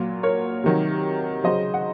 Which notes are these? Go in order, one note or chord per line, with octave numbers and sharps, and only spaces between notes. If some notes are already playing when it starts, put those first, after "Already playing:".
Already playing: A#2 F#3 F4
A#4 C#5
C3 D#3 F#3
C#3 F#3 C5 D#5
F#5